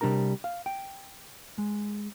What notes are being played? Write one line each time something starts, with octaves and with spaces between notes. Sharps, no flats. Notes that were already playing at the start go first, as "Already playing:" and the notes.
C3 G3 D4 A#4 A#5
F5
G5
G#3